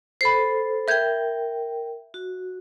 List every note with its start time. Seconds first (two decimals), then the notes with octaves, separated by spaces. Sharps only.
0.21 A4 C5 B5 C7
0.88 A#4 E5 G5 G6 G#6
2.14 F#4